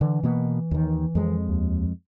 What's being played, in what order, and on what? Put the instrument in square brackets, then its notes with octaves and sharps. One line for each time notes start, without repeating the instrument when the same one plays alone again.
[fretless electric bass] D3 [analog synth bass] E3
[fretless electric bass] B2 A#3 B3
D#2 D#3
F2 G#3
[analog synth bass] D#2